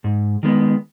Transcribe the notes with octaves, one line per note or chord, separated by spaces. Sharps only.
G#2
D#3 G#3 B3